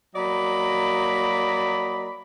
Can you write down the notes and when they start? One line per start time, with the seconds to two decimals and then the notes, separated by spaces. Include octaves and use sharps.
0.15 F#3 A#3 D5 D#5 A#5 B5